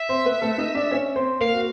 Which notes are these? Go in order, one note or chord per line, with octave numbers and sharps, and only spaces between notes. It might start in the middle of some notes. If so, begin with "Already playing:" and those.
Already playing: E5
C4 C5
B3 B4
A3 A4
D#4 D#5
D4 D5
C#4 C#5
C4 C5
A#3 A#4 F5
F#4